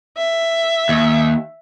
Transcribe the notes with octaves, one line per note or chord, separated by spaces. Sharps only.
E5
D#2